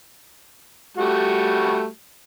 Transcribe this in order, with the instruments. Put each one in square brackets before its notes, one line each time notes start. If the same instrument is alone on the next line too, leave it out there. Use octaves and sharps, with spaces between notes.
[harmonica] G3 A3 F#4